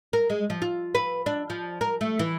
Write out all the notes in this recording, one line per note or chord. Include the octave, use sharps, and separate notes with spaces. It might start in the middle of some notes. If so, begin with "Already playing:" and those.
A#4
G#3
F3
F4
B4
D4
F3
A#4
A3
E3